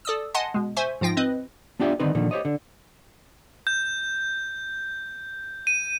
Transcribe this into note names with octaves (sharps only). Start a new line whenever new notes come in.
A4 D5 D#6 E6
D#5 F#5 G#5 A5 C6
B2 G#3
C5 E5 G#5 C#6
G#2 F3 F4 G5 A#6
C4 B4 D#5
B3 D4 F4 G4 D5 E5
D3 D#3 C4 D#4 B4
A#2 D3 D#3 F3
G4 C5 C#5 D#5
D3
G6
D#7